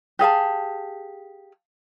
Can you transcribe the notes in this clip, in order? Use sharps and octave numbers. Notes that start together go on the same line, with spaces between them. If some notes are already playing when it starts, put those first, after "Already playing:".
G4 G#4 F5 A5